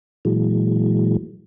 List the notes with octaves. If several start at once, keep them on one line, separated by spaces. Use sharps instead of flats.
A#2 E3 F#3 G#3